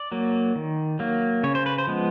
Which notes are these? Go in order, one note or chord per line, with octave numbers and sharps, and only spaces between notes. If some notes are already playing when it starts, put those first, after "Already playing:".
Already playing: D5
F#3 A#3
D#3
F#3 A#3
C#3 C#5
C5
B4
C5
F3 G#3 B3